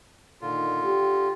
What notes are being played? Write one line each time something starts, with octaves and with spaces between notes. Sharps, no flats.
A#2 D3 D#3 F4
G4